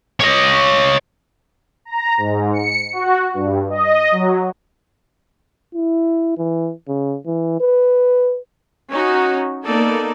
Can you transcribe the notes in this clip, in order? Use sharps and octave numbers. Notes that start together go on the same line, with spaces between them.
C#5 D#5
A#5
G#2
C#7
F#4
G2
D#5
F#3
E4
E3
C#3
E3
B4
C#4 D#4 F#4
A#3 B3 D#4 A4 D5